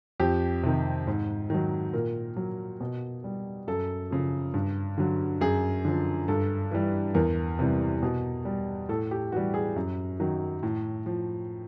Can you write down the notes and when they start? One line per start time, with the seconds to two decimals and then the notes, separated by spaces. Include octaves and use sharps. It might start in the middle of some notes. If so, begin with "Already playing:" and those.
0.20 F2 G4
0.63 C3 D#3
1.07 G#2
1.50 D#3 F#3
1.93 A#2 A#4
2.36 F#3
2.81 B2
3.24 G3
3.67 F#2 A4
4.11 C#3 F3
4.54 G2
4.98 D3 F#3
5.41 F#2 G#4
5.85 D3 F3
6.28 G2 A4
6.71 E3 G3
7.14 E2 A#4
7.59 C3 E3 G3
8.03 B2
8.45 G3
8.89 A2 A4
9.11 G4
9.32 E3 G3 F#4
9.54 G#4
9.76 F#2
10.20 D#3 F#3
10.63 A2
11.06 F3